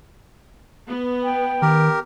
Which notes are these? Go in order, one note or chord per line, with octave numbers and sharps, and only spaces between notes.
B3
G5
D#3 G4 A#4